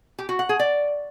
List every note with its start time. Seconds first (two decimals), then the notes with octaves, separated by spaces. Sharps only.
0.19 G4
0.29 F#4
0.39 F#5
0.49 G#4
0.60 D5